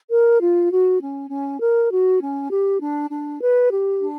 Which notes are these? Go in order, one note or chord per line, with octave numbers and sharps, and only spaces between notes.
A#4
F4
F#4
C#4
C#4
A#4
F#4
C#4
G4
D4
D4
B4
G4
D4